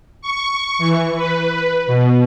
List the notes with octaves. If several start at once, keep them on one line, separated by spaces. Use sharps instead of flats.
C#6
E3
B4
B2